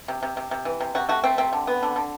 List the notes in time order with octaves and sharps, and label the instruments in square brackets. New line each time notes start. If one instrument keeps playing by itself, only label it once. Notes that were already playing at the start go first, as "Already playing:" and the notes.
[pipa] C3
C3
C3
C3
E3
C3
C3 F#4
A3 F#4
A3 C4
C3 C4
D3
B3
D3
D3